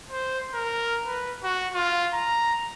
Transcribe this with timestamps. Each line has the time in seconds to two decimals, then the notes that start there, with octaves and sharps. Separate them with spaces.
0.11 C5
0.54 A#4
1.06 B4
1.44 F#4
1.74 F4
2.14 A#5